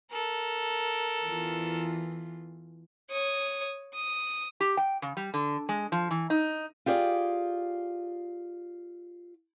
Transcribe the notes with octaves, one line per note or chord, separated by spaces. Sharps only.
A4 A#4
E2 E3 F4
C#5 D#6
D#6
G4
G5
C#3
G3
D3
G#3
F3
E3
D#4
F4 G4 G#4 D5 F5